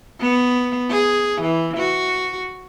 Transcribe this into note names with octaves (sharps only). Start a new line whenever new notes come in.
B3
G#4
E3
F#4